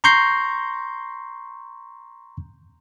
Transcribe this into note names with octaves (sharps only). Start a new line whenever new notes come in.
A#5 C6 C#6 G6 A#6 C7